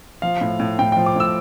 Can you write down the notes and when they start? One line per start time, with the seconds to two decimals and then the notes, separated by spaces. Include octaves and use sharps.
0.22 F3 F5
0.41 A2
0.60 A2
0.79 A2 G5
0.92 F3 G5
1.06 D6
1.16 A2 E6